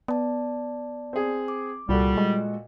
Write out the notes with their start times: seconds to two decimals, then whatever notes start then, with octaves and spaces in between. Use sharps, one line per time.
0.08 B3 D5 A5
1.13 C4 G#4
1.48 D6
1.89 C2 A#2 G3 F#4 A4
2.17 G#3 D#5